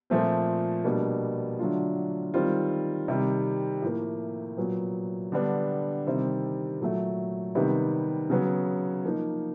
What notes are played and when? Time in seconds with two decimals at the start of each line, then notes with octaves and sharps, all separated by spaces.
0.10 A#2 F3 A3 C4
0.84 B2 G3 A#3 D4
1.59 D3 F#3 A3 D4 F4
2.34 D#3 G3 C4 F4
3.08 C3 D#3 G3
3.82 A2 F3 A#3
4.57 A#2 F#3 B3
5.32 D3 G3 B3 D4
6.06 C3 D#3 G3 C4
6.81 A#2 F#3 A3
7.55 C3 D#3 G3 B3
8.30 C#3 F#3 B3
9.04 F3 A#3 D#4